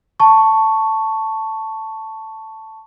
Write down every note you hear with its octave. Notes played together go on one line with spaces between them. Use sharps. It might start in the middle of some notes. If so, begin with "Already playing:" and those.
A5 C#6